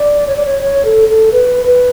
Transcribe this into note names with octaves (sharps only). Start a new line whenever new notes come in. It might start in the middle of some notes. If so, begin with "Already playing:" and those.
Already playing: D5
C#5
D5
C#5
C#5
A4
A4
B4
B4